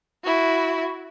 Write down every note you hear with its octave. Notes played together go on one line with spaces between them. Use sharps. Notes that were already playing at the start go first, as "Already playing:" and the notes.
E4 F#4